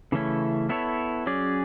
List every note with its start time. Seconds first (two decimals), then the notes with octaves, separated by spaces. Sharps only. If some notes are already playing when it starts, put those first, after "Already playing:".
0.12 C#3 E3 A3 C#4 E4
0.69 B3 E4 A4 C#5
1.26 F#3 C#4 G#4 D5